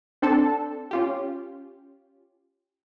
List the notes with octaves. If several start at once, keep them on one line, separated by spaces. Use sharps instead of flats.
C4 D4 A4 A5
C#4 F4 G4